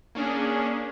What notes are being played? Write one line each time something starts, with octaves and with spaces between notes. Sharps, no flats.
A#3 C#4 D4 G#4